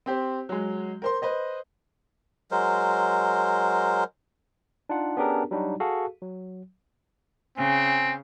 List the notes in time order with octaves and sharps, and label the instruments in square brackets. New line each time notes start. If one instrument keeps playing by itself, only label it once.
[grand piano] C4 G4 C5
F#3 G#3
A#4 C5 C6
B4 C5 D#5
[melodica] F#3 G#3 A#4 C5
[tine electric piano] D4 D#4 F4 F#5
B3 C#4 D4 G4 G#4 A#4
F#3 G3 D4 D#4 F#4
F#4 G#4 A4 F5
F#3
[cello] C#3 [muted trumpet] C4 [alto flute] G#5